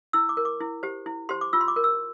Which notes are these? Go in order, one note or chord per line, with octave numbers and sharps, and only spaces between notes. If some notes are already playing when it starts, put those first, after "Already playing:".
E4 E6
D6
A#4
D6
E4
G4 C5
E4
G4 C5 C6
D6
F4 E6
C6
D6
A#4
E6